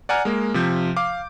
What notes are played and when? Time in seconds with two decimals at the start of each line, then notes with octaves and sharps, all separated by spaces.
0.09 D5 F#5 G#5 A#5 F6
0.25 G#3 A#3
0.54 C3 F3 G6
0.97 F5 D6